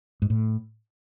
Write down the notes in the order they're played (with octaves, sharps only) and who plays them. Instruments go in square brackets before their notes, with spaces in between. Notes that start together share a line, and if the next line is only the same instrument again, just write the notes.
[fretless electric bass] G#2
A2